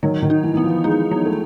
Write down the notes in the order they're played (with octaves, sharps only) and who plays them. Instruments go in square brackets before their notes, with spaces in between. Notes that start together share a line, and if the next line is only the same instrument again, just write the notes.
[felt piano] D#3 [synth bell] F#3
[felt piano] D#3
[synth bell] D#4
[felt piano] E3
[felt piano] E3 [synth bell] B3
[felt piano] F3
[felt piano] G#3 [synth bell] D#4
[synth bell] F#3
[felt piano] A3